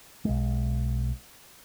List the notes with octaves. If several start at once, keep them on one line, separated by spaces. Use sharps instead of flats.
B1 G#3